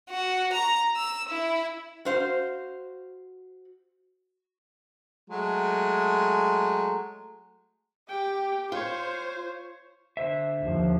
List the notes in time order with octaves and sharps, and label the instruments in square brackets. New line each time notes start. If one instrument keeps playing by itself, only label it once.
[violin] F#4
A#5
E6
E4
[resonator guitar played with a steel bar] F#4 C5 F5
[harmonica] F#3 G#3 A3
[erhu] G4 [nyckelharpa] G5
[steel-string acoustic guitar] F4 [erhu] C5 [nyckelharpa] C#5
[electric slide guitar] D3 C5 E5
[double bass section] D#2 F3